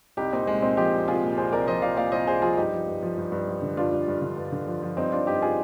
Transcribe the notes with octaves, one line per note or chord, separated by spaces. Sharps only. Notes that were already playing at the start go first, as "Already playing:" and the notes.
C2 D#4 G4
A#2 C4 D#4
C2 G#3
A#2 C4 D#4
F3 D#4 G4
C2
C2 F4 G#4
A#2
C2 G#4 C5
C2 A#4 D5
F3 C5 D#5
F3 D5 F5
A#2 D5 F5
C2 C5 D#5
C2 G#4 C5
F3 F4 G#4
G2 D#4 G4
F3
G2
F3
G2
G2
F3
D3
G2 D4 F4
G2
G2
D3
G2
D3
F3
F3
G2 C4 D#4
F3 D4 F4
G2 D#4 G4
F4 G#4